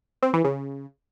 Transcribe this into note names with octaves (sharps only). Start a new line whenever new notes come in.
C4
E3
C#3